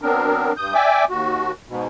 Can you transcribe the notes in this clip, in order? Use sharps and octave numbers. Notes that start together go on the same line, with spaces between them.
F#3 B3 C4 D4 A#4
G2 D#6 G6
D5 E5 G5 G#5 D6
D#2 F#4
G#2 B2